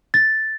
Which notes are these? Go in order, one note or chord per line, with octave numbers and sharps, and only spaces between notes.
A6